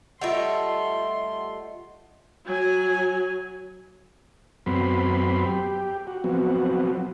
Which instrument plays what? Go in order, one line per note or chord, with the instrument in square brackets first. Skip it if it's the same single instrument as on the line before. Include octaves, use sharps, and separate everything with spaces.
[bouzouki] G3 A3 [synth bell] F4 D#5 F#5 [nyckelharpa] C6
[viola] F#3 G#5
[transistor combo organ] F#2 F#3 B3 C4 B5 C6
G4
F#4
F3 F#3 B3 C4 F#4